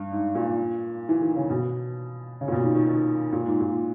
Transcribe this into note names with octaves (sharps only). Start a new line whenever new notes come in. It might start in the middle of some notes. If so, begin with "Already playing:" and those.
Already playing: G2
G#2
A#2
E3
D#3
C#3
B2
C#3
A#2
B2
D#3
D#3
D#3
A#2
G#2
A#2